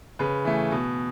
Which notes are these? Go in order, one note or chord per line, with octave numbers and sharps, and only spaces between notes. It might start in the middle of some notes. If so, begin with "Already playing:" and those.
C#3 B4
E3 A3
B2